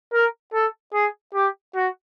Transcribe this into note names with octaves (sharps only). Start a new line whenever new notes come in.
A#4
A4
G#4
G4
F#4